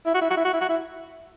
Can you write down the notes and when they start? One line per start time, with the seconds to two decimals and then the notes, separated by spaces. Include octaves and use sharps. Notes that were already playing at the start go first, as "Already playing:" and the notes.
0.06 E4
0.14 F#4
0.21 E4
0.30 F#4
0.37 E4
0.44 F#4
0.53 E4
0.61 F#4
0.69 E4